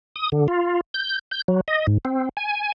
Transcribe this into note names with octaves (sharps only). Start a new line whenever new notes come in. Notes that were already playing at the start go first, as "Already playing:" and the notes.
D#6
D3
F4
G6
G6
F#3
D#5
G#2
C4
G#5